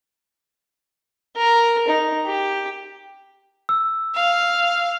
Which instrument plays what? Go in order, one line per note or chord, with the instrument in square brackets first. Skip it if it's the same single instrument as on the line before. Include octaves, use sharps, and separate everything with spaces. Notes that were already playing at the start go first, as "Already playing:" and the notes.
[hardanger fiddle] A#4
D#4
G4
[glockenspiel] E6
[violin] F5